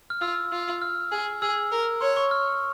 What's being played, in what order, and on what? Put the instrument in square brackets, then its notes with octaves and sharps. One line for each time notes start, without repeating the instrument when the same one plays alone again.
[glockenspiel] F6
[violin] F4 [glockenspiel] E6
[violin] F4
[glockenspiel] F6
[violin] G#4
[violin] G#4 [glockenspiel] E6
[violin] A#4
[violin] C#5 [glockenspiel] C6
[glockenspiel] C#6
F6